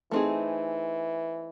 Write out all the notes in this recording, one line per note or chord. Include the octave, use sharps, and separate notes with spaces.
E3 A3 C4 D#4 G#4